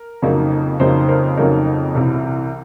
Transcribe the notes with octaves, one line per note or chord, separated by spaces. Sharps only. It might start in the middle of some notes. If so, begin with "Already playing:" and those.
Already playing: A#4
F2 C#3 F#3 A#3 D#4
F2 C#3 F#3 A#3 D#4 A#4 C5
A#4 C5
F2 C#3 F#3 A#3 D#4 A#4
C2 C3 E3